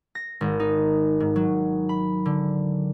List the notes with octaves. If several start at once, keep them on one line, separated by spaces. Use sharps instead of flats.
A#6
G#1
D#4
G#2
F#3
B5
D3